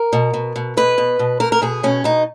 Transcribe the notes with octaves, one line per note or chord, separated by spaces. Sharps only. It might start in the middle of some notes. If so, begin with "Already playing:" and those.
Already playing: A#4
B2
B2
B2
B2 B4
B2
B2
B2 A#4
A#4
B2 G#4
B2 C#4
B2 D#4